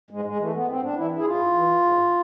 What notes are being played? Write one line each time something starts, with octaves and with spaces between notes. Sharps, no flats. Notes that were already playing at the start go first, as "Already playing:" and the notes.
G#2 G#3
G#3
E3 A3
B3
G#2 C4
D4
E3 E4
E4
G#4
G#2 F4
E3
G#2